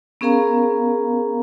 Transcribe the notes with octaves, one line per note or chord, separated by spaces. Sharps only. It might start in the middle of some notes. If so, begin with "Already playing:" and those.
B3 C#4 G#4 A#4 F5 A#5